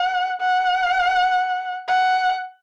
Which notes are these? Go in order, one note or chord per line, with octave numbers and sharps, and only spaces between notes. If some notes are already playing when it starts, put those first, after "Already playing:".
Already playing: F#5
F#5
F#5